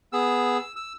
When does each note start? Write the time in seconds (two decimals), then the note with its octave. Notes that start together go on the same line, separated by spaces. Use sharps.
0.13 B3 G#4 E6
0.76 E6